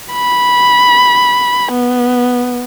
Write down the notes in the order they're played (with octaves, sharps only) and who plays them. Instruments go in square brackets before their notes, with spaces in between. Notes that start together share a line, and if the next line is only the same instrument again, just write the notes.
[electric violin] B5
B3